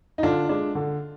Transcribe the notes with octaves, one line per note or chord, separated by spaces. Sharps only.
D#4
D3 D4 F4
G#3 D4
D3